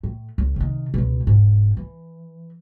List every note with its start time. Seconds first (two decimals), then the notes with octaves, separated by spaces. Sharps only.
0.03 A2
0.38 C#2
0.56 C3 D#3
0.94 C#2 B2
1.27 E1 G#2
1.77 E3